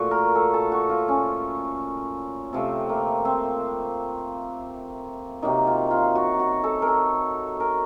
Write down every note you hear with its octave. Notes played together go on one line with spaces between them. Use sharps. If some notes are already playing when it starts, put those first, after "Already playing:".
Already playing: A#2 F3 A3 F#4
A#4
A4
A4
F#4
F4
C#4
C3 F3 A3 C4
A#3
C4
C3 F#3 A#3 D#4
F4
F4
F#4
F#4
A4
A#4
A4
A#4